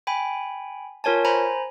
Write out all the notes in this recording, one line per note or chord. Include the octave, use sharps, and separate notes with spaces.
G5 G#5 B5
F4 A#4 C#5 G#5 A5
C5 G#5 A#5 B5